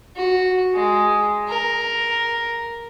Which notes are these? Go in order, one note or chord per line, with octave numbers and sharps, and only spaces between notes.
F#4
G#3
A#4